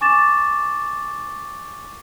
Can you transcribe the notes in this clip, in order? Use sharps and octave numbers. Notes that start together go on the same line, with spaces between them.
G#5 C#6 D6 A6 E7